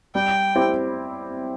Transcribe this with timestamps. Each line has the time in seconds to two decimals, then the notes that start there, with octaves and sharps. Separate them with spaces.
0.15 G3 G5
0.56 C4 E4 G4